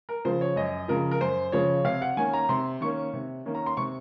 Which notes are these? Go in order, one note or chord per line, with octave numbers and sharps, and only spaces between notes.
A#4
C#3 F3 C5
C#5
F#2 D#5
C#3 F3 A#4
A#4
F#2 C5
C#3 F3 C#5
C3 F5
F#5
D#3 A#3 C#4 G#5
A#5
C3 C6
D#3 A#3 C#4 C#6
C3
D#3 A#3 C#4
A#5
C6
C3 C#6